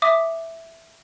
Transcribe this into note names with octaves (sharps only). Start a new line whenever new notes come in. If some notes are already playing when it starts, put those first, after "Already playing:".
E5 D6 D#6